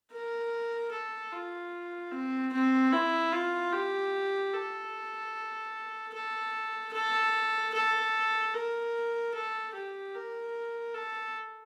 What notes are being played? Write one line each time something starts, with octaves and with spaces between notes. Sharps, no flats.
A#4
A4
F4
C4
C4
E4
F4
G4
A4
A4
A4
A4
A#4
A4
G4
A#4
A4